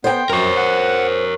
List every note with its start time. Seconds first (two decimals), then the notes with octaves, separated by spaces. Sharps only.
0.04 B3 C5 G5
0.30 F#2 A#4 C#5
0.57 F#5